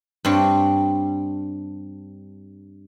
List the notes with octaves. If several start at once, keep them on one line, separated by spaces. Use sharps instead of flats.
G2 C4 D4 C#5